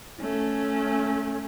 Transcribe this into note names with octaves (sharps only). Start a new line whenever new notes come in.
A3 C#4